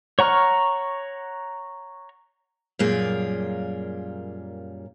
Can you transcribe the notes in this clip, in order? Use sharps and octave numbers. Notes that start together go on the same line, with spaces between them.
C#5 F#5 A#5 C#6 F6
F#2 A#2 G3 A#3 F4 G#4